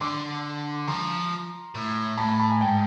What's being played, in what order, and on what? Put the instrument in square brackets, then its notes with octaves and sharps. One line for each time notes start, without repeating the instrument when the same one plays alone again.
[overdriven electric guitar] D3 [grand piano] C6 D6
[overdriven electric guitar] F3 [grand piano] A#5 C6
[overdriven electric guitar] A2
[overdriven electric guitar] A2 [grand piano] A5 B5
[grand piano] A5 B5
A5 B5
G#5 A#5
[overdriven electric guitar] G#2 [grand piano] G5 A5